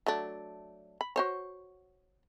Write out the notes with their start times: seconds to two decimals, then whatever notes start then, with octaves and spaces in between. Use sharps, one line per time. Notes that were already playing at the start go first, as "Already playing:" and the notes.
0.06 F#3 A3 D4
1.01 B5
1.16 F#4 C5 C#5